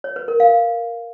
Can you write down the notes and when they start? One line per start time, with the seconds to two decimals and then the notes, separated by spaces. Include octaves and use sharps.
0.04 C#5
0.16 B4
0.28 A#4
0.40 F5